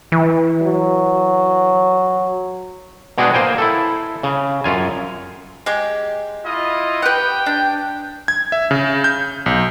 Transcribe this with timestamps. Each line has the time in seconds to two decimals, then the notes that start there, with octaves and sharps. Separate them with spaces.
0.12 E3
0.63 F#3
3.18 B2 G#3 D4 F#4 G#4 G5
3.33 A#3 C5 G5 G#5
3.58 E4 A4
4.23 C#3
4.64 F#2 F4 G#5
5.66 G#3 G4
6.45 E4 F4 D#5
7.02 G4 B4 F#5 G5
7.46 D4
8.28 G#6
8.52 E5
8.71 C#3
9.04 G6
9.46 B1